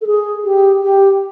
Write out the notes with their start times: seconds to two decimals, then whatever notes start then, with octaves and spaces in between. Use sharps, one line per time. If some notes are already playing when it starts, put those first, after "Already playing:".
0.01 A4
0.07 G#4
0.45 G4
0.83 G4